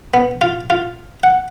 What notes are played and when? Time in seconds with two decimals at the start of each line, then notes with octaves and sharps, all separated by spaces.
0.14 B3
0.41 F4
0.70 F4
1.23 F#5